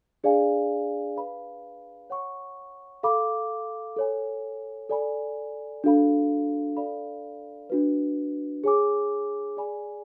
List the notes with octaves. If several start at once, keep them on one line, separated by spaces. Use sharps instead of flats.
D4 G#4 D5 F5 G#5
B4 F5 B5
C#5 F#5 C#6
A4 F5 B5 D6
A4 C#5 G#5
A4 D5 G#5 B5
D4 F#4 A4 F5 B5
A4 D5 F5 B5
D4 F#4 B4
G#4 C#5 G#5 D6
G#4 D5 G#5 B5